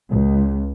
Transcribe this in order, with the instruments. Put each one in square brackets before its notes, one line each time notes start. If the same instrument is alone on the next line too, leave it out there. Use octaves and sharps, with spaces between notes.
[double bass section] C#2